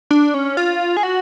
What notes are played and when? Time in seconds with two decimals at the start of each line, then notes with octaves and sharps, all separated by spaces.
0.11 D4
0.34 C#4
0.57 F4
0.97 G#4
1.03 F#4